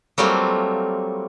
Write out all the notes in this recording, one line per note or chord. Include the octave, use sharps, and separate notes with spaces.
F#3 G3 A3 A#3 C4 F4